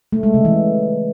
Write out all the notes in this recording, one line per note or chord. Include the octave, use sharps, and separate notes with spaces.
A3
G#3
C#3
E3